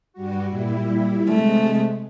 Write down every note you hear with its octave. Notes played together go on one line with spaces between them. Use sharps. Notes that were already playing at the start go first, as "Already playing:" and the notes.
G2 G3 F#4
A#2 G3 E4
C3 G#3 A3